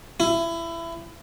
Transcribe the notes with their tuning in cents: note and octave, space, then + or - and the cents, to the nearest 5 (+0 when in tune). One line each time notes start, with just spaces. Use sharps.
E4 +25